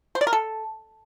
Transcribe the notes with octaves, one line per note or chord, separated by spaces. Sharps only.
C5
D5
A#4
A4